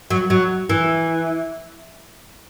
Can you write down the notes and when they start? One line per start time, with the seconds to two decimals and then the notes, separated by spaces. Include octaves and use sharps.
0.10 F#3
0.30 F#3
0.69 E3